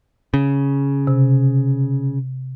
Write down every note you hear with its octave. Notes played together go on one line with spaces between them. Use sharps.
C#3
C3